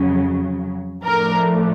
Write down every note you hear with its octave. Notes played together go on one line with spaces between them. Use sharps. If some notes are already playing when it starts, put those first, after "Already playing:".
Already playing: F2 C#3 F#3
A2 F3 A3 D4 A#4